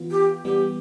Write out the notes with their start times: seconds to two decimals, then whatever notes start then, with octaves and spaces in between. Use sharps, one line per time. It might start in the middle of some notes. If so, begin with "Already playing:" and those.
Already playing: E3 B3 F4
0.11 G4
0.45 E3 G3 B3 G4